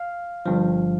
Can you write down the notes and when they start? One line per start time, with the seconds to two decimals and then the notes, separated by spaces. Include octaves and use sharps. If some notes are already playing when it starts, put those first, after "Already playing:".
Already playing: F5
0.46 G1 G2 F3